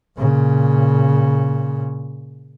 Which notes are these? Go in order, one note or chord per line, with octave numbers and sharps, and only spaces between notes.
A#2 C#3